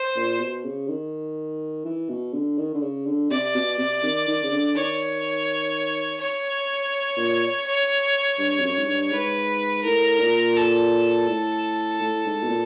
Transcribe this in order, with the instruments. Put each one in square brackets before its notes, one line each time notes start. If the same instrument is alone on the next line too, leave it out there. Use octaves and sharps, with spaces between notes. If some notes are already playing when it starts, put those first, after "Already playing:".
Already playing: [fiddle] C5
[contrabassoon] A#2
B2
C#3
D#3
E3
B2
D3
D#3
D3
C#3
D3
[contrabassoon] C3 [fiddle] D5
[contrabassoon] B2
C3
D#3
D#3
C#3
D3
[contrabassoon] D#3 [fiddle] C#5
[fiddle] C#5
[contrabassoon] A#2
[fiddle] C#5
[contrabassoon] G2
F2
F#2
G#2
G2
[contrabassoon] G#2 [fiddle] B4
[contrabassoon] A2 [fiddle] A#4
[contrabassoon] A#2
[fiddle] A4
[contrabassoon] A2
A2
G#2
B2
A#2